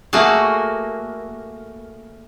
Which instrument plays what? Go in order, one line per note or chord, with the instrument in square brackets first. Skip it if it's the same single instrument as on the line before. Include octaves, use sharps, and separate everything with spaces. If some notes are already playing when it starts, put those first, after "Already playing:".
[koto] A3 A#3 F#4 G#4